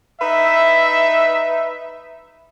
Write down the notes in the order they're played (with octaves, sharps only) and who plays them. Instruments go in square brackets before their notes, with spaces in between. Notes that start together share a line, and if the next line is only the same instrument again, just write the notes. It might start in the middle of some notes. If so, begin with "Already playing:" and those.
[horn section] D#4 B4 E5